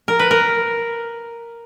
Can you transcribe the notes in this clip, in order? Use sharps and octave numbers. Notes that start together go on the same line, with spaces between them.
A#4
B4
A#4